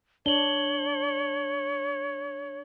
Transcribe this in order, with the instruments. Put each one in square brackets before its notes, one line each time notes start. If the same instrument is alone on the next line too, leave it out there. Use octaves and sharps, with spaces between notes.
[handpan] D4 [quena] C#5 [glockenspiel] F#7 G7